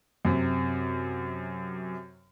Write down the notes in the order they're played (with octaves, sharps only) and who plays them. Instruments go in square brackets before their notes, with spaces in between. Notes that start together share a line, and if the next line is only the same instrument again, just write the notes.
[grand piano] F#2 C3